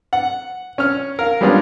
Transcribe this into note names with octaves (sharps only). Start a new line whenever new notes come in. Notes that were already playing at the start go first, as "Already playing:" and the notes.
F#5
C#4 F6
A#4 F5
G3 G#3 B3 C#4 D4 F4